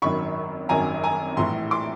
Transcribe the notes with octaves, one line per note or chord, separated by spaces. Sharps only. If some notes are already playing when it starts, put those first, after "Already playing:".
G#1 F#2 D#3 F#3 B5 C#6
G#1 F#2 D#3 F#3 G#5 A#5
G#5 A#5
A#1 A2 E3 A#5 C6
C6 D6